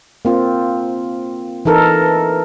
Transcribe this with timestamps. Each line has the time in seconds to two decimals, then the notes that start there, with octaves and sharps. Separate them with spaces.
0.25 A#3 C4 F4
1.65 E3 D#4 A4 A#4